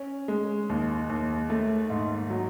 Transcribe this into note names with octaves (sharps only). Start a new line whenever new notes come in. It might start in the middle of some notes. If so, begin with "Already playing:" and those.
Already playing: C#4
G#3
D#2
D#2
A3
G#2
F#3